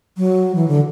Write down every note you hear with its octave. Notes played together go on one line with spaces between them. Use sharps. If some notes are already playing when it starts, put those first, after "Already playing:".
F#3
E3
D3